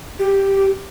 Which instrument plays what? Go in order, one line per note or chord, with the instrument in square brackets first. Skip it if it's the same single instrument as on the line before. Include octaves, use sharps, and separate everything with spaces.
[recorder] G4